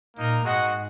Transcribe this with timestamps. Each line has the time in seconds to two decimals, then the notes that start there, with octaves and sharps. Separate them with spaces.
0.16 A#2 A#3 D#4 A#4
0.44 G#2 G#3 F#4 D#5 F#5